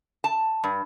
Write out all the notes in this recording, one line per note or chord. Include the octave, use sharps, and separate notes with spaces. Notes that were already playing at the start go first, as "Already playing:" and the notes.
A5
G2